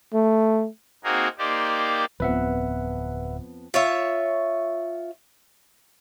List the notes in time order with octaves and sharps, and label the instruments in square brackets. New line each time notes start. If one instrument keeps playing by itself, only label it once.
[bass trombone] A3
[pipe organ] A#3 C4 D#4 F#4 G#4 A#4
A#3 D#4 G4 C5 D5
[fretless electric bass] D1 [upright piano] F2 B3 [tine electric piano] B4 E5 F#5
[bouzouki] F4 C#5 E5